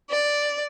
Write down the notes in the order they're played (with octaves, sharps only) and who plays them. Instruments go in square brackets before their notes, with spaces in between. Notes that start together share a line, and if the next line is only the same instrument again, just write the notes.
[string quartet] D5